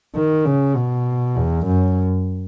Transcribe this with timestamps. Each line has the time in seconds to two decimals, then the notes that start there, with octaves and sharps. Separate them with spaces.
0.15 D#3
0.45 C#3
0.75 B2
1.36 E2
1.66 F#2